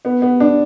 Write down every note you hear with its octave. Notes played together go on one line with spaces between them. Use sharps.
B3
B3
D4